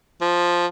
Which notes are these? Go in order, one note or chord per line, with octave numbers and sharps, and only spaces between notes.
F3